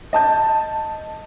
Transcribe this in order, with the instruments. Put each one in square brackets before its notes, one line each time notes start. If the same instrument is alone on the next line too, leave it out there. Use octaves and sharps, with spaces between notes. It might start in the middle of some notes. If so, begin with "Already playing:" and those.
[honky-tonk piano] D#5 A5 G6